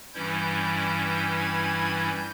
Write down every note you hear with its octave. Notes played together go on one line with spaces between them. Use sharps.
G2 E3 G3 C#4 E4 G6
G#6
G6